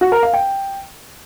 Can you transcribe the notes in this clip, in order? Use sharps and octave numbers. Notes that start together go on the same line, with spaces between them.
F#4
A#4
F5
G5